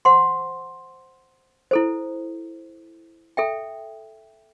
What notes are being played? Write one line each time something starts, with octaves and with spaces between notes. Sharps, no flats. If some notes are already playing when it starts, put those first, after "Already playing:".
C5 F#5 C6
E4 A4 C5
A4 E5 G5